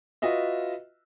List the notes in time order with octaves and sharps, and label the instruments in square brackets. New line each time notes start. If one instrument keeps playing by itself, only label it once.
[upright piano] F4 F#4 B4 D#5 E5